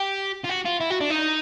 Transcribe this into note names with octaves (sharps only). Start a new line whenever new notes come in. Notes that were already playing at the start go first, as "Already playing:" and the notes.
Already playing: G4
F4
F#4
F4
E4
F#4
D4
D#4